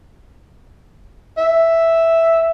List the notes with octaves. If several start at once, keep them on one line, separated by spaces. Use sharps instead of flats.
E5